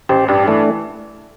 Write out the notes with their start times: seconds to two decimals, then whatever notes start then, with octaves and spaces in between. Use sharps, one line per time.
0.09 A1 G4 C5
0.28 G2 D4 G4
0.48 E3 A3 D4